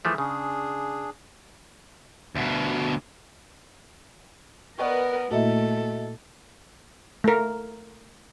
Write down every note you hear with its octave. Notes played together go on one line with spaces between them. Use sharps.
E3 F3 A3 G#4 E5
C#3 D4 G#4
D2 B2
B3 A#4 B4 D5 D#5 C#6
A#2 A3 A#3 E4 F#4 A4 D#5 E5
A3 A#4